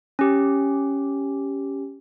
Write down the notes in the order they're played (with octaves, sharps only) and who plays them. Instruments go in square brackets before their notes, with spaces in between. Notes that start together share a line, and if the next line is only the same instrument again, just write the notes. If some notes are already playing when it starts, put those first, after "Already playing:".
[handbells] C#4 G4